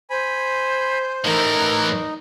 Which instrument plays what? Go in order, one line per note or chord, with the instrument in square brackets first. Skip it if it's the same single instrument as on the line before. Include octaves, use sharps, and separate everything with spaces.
[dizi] C5 [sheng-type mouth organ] G#5 B5
[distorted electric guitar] A2 E3 [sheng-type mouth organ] D#4 [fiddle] A#4